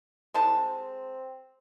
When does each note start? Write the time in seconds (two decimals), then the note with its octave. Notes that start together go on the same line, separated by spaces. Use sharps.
0.34 C2 G#3 G4 A5
0.57 C4